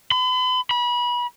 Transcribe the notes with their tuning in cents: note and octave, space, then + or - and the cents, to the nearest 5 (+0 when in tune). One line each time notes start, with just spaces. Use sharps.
B5 +40
B5 -30